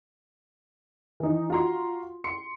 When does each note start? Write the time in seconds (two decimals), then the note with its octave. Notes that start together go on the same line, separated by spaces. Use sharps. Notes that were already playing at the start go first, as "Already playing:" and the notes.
1.20 E3 D#4
1.50 F4 F#4 A#5 C6
2.24 C6 C#7